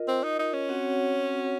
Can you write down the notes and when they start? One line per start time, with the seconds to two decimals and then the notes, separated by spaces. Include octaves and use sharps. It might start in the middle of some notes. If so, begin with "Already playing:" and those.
Already playing: F4 A#4 D#5
0.08 C4
0.23 D#4
0.39 D#4
0.54 C#4
0.69 C4 F#4 C#5 F#5